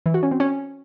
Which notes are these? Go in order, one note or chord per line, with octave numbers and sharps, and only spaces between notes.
E3
F#4
C#4
C4
C#4